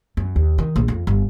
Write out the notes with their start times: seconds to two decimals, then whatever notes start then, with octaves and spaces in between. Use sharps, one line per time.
0.17 F#2
0.36 D#2
0.58 D#3
0.76 A#1
0.88 F2
1.07 G1